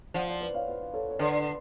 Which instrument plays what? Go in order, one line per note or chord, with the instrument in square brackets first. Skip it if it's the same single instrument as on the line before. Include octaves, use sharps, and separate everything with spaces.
[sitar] F3 [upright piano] D5 F#5
[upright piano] D5 F#5
B4 D5
C#5 F5
B4
A4 C#5
C#5
[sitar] D3 [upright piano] B4 D5